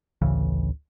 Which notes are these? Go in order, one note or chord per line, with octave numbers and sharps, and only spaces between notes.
A1 D2 C#3 E3